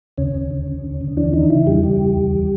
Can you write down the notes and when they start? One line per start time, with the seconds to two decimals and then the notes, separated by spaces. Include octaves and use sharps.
0.18 D#2 C#3 C#4
0.35 D#2
0.51 D3
0.67 D#2
0.84 D3
1.01 D#2
1.17 D3 E3 D4
1.34 D#3 E3 D#4
1.50 C#3 E3 E4
1.67 E2 G3 G4
1.84 C#3
2.00 E2
2.17 D#2
2.34 E3